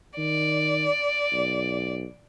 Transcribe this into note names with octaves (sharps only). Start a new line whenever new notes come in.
D#3 D5
B1